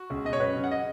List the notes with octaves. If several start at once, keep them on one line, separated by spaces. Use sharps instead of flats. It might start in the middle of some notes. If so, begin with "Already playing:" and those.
Already playing: F#4
C#2
B2 D#5
C#5
F#2 B4
C#3
F#5
D#5